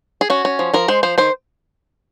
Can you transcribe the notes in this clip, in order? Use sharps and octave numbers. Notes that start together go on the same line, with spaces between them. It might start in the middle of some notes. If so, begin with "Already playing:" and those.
G#4
C#4 F#4
C#4
F3
F3 A#4
G#3 C5
F3 C5
D#3 C5